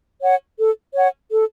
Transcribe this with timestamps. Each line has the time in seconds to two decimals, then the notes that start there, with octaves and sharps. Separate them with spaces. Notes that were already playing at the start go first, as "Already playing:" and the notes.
0.22 C#5 F#5
0.58 A4
0.94 C#5 F#5
1.31 A4